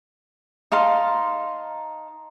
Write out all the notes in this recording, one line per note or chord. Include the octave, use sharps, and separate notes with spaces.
D#4 F5 A5 C6